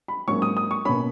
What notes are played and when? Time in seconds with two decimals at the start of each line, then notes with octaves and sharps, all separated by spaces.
0.08 B5
0.28 G#2 F#3 A#3 C#4 C#6
0.42 D#6
0.57 D#6
0.71 C#6
0.85 B2 A#3 C#4 B5